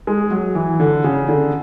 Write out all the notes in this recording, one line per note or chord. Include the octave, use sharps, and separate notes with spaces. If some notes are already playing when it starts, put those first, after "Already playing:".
G#3
F#3
E3
D3
C#3
D3